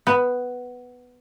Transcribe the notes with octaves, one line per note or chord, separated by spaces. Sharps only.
B3